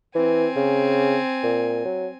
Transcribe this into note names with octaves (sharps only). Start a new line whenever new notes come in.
E3 C4 G#5
C#3
A#2
F#3